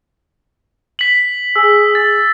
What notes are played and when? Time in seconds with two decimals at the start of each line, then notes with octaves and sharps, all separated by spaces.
0.99 B6 F#7
1.56 G#4 E6
1.95 A6